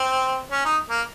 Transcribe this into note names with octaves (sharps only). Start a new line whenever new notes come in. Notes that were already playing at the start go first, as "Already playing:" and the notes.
Already playing: C4
C#4
D#4
A#3